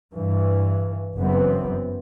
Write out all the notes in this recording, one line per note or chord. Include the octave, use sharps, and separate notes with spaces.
G2 E3
F#1 F#2 E3 B3 C4